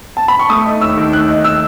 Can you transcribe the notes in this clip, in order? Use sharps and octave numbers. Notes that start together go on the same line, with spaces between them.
A5
B5
C#6
A3 D#6
D#4
D#2 E6
D#3
A3 F#6
D#4
E6